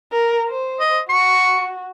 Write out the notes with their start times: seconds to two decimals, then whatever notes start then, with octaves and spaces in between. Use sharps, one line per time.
0.12 A#4
0.49 C5
0.80 D#5
1.10 F#4 C#6